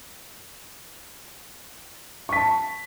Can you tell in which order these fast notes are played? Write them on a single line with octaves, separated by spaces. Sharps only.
C#6 B6 A5